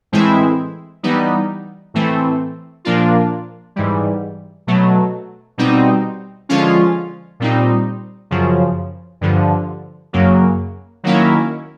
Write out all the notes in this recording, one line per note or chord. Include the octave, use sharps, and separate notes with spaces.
A2 E3 G#3 C4 E4
E3 G3 B3 D#4
A2 E3 A3 C4
A#2 F3 A#3 D4 F4
G#2 E3 G3
B2 F#3 A3
B2 G3 C4 D#4
D3 F3 G#3 C#4 F4
A#2 G3 C4 D#4
F#2 C#3 F3
G2 D3 F3
F#2 C#3 F#3 A#3
D#3 F#3 A#3 C#4 E4